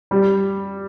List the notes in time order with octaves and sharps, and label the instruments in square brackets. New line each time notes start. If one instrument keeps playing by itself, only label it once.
[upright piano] G3